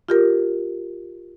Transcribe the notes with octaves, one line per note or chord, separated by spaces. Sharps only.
F4 G4 A#4